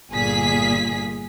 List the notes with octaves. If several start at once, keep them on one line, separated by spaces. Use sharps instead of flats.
G1 A#2 G#4 B6